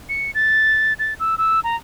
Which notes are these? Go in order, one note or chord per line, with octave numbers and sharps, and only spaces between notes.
C#7
A6
A6
E6
E6
A#5